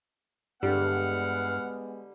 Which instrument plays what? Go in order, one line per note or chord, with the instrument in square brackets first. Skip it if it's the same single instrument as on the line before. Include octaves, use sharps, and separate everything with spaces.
[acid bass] G2 [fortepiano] D3 G3 [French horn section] G#3 B3 [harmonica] F#5 F6